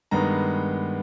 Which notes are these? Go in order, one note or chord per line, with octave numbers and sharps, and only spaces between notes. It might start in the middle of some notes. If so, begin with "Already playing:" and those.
G2 D#3 G#3 B3 A#5